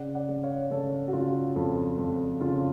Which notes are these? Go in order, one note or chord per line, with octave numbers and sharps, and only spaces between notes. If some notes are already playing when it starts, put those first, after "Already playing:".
Already playing: C#3 D5 F#5
D5 F#5
C#3
C#5 F5
C#3 A4 C#5
F#4
C#3 F4
F2
F2
C#3 F4